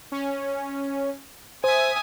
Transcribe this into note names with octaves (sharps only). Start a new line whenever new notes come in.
C#4
C5 E5 G#5 D#6